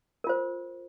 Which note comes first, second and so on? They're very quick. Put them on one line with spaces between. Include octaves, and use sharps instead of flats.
A#4 F4 C5